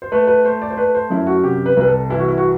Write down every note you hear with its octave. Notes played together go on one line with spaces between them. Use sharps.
C5
A3 B4
B4
A3 C5
D5
C5
A3 B4
C5
F#2 E4
F#4
C3 G4
B4
C2 B4
A4
E3 E4
F#4
E4
F#4